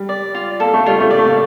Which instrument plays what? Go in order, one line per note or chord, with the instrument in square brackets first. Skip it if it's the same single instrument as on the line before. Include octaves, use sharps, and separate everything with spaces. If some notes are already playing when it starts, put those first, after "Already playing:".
Already playing: [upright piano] G3
[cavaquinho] D5
F4
[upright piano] A#3 [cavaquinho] A4
[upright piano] A3
[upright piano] G3 [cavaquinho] F4
[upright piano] A3
[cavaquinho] D5
[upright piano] A3
A#3